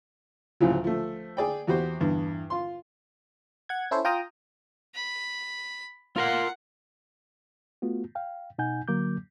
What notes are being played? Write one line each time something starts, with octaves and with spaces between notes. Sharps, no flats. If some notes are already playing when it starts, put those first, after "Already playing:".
D2 A2 C#3 F3 F#3
F3 A3
G#4 D5 G5
E2 F#4 G4 C5
E2 G2
F4 C6
F#5 G#6
C#4 E4 A4 C5 C#5
F4 G5 A#5 D#6
B5
F4 A#4 F5 F#5
A3 B3 F4 F#4
F5 G5
B2 D#4 F#5 G#5 G6
D3 F#3 A#3 D6 G6